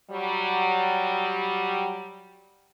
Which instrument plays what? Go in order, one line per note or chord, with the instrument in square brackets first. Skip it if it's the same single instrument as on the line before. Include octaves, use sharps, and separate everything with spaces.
[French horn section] F#3 G3